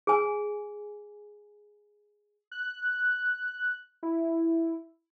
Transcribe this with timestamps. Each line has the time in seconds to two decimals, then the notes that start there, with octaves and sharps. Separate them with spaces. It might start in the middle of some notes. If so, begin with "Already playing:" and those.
0.07 G#4 G#5
2.52 F#6
4.03 E4